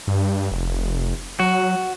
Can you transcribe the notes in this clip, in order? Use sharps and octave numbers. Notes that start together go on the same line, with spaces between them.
G2
F1
F#3 F#4